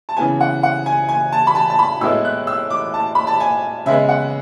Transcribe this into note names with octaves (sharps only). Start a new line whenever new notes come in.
A5
C#3 E3 B3 G#5
F#5
F#5
G#5
G#5
A5
B5
A5
A5
B5
A2 G#3 B3 E4 E6
F#6
E6
D6
A5
B5
A5
G#5
C#3 G#3 B3 E5
F#5